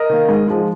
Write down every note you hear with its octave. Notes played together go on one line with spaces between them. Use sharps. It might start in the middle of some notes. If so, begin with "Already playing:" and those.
Already playing: A#4 D#5
D#3 A#3
G#2
F3 G#3